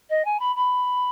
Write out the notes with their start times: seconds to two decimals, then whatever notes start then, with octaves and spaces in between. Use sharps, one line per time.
0.10 D#5
0.25 G#5
0.39 B5
0.56 B5